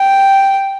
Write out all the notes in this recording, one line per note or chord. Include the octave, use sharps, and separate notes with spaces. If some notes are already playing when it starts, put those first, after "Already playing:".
Already playing: G5